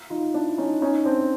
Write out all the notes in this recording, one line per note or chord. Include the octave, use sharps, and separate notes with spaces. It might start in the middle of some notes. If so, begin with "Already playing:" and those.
D#4 F4
D4 E4
C#4 D#4
C#4 D#4
C4 D4